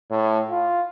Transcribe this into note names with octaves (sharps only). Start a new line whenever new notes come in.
A2
F4